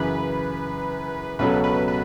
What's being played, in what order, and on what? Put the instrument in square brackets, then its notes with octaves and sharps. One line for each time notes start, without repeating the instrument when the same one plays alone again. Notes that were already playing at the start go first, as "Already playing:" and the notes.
Already playing: [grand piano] F#2 C#3 E3 [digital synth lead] B4
[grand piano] C#2 B2 F#3 C#4 A4 [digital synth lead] B4
[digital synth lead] B4
B4